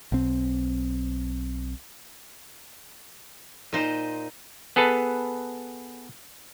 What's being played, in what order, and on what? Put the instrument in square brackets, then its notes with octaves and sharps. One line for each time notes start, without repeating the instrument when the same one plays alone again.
[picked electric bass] B1 C4
[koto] A#2 D#4 C5
[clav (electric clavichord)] B3 G#4 A4 B4 A5